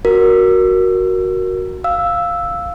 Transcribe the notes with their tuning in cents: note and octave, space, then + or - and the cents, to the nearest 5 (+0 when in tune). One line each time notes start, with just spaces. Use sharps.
F#4 +0 A#4 +5
F5 +0 E6 +0